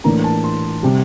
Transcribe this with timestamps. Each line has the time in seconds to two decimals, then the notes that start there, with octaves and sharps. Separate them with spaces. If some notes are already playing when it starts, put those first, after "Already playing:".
0.04 A2 E3 A#3 D4 A#5
0.24 A5
0.44 C6
0.83 C3 G3